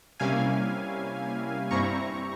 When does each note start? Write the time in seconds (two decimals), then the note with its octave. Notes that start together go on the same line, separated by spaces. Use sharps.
0.20 C3 G3 A#3 C#4 E4 F5 G#5
1.71 G2 G3 C4 E4 A#5 C#6